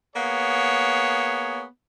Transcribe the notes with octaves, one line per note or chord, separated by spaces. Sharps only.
A#3 B3 G#4 C#5